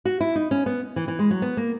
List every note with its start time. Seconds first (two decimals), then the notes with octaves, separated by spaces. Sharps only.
0.05 F#4
0.20 E4
0.36 D#4
0.51 C#4
0.66 B3
0.96 E3
1.08 E3
1.19 G#3
1.31 F#3
1.42 B3
1.57 A#3